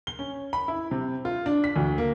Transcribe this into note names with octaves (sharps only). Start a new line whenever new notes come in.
G7
C#4
B5
E4
C3
F4
D4
B6
D2
A#3